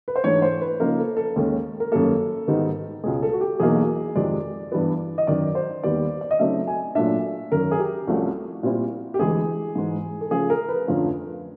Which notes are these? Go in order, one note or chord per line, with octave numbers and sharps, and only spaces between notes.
B4
C5
G#2 E3 A3 D4 C#5
C5
B4
C#3 F3 A#3 D#4 A#4
A4
A4
D#2 D#3 G#3 C#4
A#4
F#2 D#3 G3 A#3 A4
G#2 D#3 G3 B3 D#4
C#2 B2 G#3 G#4
A4
F#4
G4
E2 B2 F#3 A#3 D#4 G#4
F2 C3 D#3 G#3 D5
G2 E3 G3 B3
D#5
F#2 D#3 F#3 D5
C5
D#2 D#3 G3 B3 D5
D5
D#5
C#3 F#3 A3 C4 D#4 E5
G#5
A#2 F#3 A3 D4 E5
F#2 D#3 F#3 A#4
G#4
G4
C2 C3 F3 A3 C#4 F#4
A#2 G3 C4 E4
G4
D2 C3 E3 G#3 G#4
G#2 E3 G#3
A4
C#3 F3 A3 G#4
A#4
B4
F2 D3 F3 A3 C#4